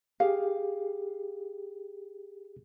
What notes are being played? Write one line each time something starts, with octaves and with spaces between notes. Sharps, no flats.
G4 G#4 F5